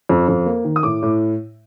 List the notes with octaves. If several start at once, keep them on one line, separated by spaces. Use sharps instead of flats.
F2
F2
A#3
D#3
D#6
A2 D6
A2